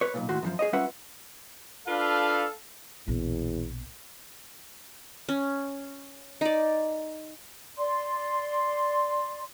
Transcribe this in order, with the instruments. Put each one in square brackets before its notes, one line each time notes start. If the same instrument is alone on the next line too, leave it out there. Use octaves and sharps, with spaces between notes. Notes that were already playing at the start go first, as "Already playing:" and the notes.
[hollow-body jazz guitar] B4 C#5
B1 G2 A#2
D#2 A2 F#4 C6
F#2 E3 F3
G#4 C#5 D#5
G3 C#4 F4 B4 E5 F#5
[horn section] D4 F4 B4 [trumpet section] A4 F5
[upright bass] A#1 B2 [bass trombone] E2
[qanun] C#4
D#4 D5
[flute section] D5 C6